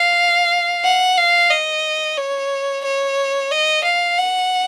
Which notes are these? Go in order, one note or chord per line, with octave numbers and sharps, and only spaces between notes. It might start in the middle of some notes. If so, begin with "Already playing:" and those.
Already playing: F5
F#5
F5
D#5
C#5
C#5
D#5
F5
F#5